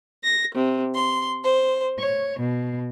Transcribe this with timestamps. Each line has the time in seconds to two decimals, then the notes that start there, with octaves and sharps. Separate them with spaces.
0.24 A#6
0.56 C3
0.94 C6
1.44 C5
1.98 C#5
2.39 B2